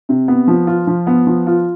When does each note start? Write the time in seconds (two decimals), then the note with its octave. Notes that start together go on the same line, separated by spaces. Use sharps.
0.09 C3
0.28 B3
0.48 F3
0.67 F4
0.87 F3
1.07 B3
1.27 F3
1.47 F4